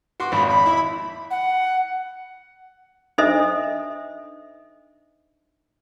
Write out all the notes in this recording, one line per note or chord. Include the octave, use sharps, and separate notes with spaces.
F#4 C6 D6
G#1 F2 B5
B5
E4
F#5
D4 D#4 A4 C5 D#5 E5